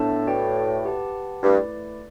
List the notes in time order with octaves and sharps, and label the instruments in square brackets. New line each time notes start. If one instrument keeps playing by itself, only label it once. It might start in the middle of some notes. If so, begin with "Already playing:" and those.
Already playing: [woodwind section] A2 [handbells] B3 D4 A4 E5 A5
[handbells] F#4 B4 D5 G5
G4 B4 F#5 A5
[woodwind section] G2 [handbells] A3 E4 B4 D5